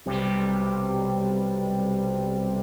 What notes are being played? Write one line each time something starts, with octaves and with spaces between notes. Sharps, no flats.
B1 C3 G3